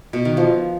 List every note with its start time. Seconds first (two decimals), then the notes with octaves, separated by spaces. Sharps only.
0.13 B2
0.25 D#3
0.37 F3